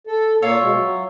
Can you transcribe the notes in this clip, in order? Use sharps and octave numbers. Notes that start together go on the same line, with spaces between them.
A4
A#2 A#3 F4 C#5 E5
B2 G#3
F#3